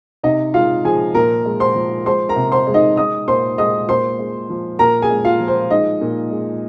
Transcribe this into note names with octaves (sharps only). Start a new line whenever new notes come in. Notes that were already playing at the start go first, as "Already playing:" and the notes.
C3 D#4 D#5
G#3 F4 F5
F3 G#4 G#5
A#2 A#4 A#5
G#3
C5 C6
F3
G#3 C5 C6
A#4 A#5
C3
C5 C6
G#3
D#4 D#5
G#3 D#5 D#6
A#2 C5 C6
G#3 D#5 D#6
A#2 C5 C6
G#3
F3
A#2 A#4 A#5
G#4 G#5
G#3
F4 F5
F3
C5
G#3 D#4 D#5
A#2
G#3